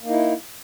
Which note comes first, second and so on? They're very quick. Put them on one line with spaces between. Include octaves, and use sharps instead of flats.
A#3 D#4 E4